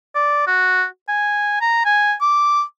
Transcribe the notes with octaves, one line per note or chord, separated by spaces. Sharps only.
D5
F#4
G#5
A#5
G#5
D6